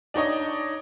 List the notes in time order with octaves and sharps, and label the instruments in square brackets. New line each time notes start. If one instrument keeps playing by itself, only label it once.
[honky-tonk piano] D4 D#4 C#5 D#5